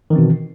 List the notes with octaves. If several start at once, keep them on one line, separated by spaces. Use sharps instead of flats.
B2 D#3 E3 C4